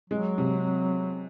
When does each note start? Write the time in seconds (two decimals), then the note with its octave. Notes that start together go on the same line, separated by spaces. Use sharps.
0.10 F#3 G#3
0.38 C3